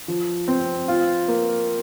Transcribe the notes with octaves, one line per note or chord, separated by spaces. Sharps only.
F3
C4
F4
A#3